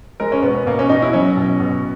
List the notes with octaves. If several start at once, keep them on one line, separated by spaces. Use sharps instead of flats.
G#3 A#4
C#4
B2 B3
B3
B2 A#3
C#4
B2 D#4
E4
F#3 C#4
B2
B2